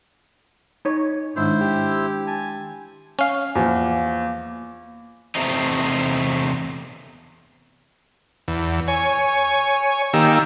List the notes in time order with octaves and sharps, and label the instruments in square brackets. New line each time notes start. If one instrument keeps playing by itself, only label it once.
[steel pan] D#4 C#5
[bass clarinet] G#2 [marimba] D#3 G#3 D4 [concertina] E4 C5
[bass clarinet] G4
[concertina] G#5 [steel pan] A5
[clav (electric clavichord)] C#4 F5
[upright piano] E2 F3 [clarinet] A#3
[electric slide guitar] E2 C3 A3 C4 D#4
[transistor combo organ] E2
C#5 G#5
D#3 A#3 G4 E6